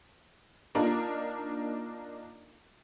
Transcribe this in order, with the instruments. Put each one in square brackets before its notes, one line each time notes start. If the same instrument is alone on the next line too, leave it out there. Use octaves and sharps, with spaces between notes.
[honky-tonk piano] A#3 D4 D#4 F4 A#4